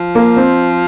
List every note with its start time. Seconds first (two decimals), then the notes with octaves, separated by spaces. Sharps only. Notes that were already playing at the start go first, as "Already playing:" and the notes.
Already playing: F3
0.15 A#3
0.37 C4